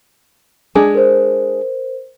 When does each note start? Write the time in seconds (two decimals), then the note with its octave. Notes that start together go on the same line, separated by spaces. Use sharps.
0.75 G#3 D4 G#4
0.95 A#4 C5